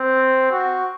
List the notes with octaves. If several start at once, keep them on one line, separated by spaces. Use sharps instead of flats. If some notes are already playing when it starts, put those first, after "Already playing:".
Already playing: C4
F#4